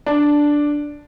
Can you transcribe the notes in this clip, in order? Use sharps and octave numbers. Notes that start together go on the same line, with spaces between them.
D4